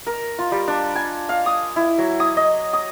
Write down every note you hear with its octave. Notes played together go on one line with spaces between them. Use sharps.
A#4
F4
G3
D4
G#5
F5
D#6
E4
F#3
D#6
D#5
D#6